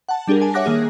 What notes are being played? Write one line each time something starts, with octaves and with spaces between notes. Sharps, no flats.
F#5 A5
G3 D4 G4 G#4 A#4
G#5 A5
C#5 E5 F#5 D6 F#6 A#6
D#3 A#3 G#4